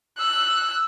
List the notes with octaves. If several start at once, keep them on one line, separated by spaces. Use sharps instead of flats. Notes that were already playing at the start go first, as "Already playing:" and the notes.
E6 F#6